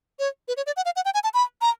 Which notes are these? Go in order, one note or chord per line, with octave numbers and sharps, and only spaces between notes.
C#5
B4
C#5
D5
F#5
F5
F#5
G5
G#5
A5
B5
A#5